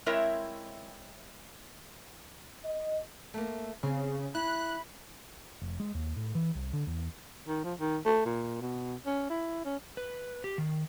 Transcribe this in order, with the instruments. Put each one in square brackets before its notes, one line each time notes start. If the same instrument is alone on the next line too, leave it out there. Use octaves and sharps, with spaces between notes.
[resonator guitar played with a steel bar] G#3 C4 E4 A#4 C#5 E5
[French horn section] D#5
[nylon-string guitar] A3 A#3
[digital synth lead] C#3 [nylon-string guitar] C4 G#4
[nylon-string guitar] E4 [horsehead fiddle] B5 [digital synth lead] F#6
[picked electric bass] F1
G#3
D#2
A2
E3
C2
D3
E2
[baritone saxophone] D#3
F3
D#3
A3
A#2
B2
C#4
E4
C#4
[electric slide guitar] B4
G4
D#3